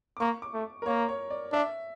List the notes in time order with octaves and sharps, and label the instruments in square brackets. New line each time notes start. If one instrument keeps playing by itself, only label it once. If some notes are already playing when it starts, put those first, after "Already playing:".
[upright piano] D6
[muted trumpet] A#3 [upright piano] C#6
[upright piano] D6
[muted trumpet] A3
[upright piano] A#4
[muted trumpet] A#3 [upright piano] C#5
[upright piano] C#5
D5
[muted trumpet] D4 [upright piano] E5